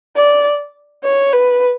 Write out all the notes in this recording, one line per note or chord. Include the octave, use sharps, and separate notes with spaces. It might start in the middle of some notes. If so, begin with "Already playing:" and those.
D5
C#5
B4